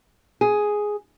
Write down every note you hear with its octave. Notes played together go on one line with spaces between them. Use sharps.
G#4